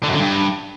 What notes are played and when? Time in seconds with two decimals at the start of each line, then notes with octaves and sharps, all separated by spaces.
0.04 D3
0.09 F#2
0.14 D3
0.19 G2